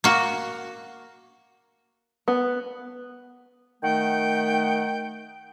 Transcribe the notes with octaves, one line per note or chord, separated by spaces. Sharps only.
A#3 F#4
B3
D#3 A3 F#5 G5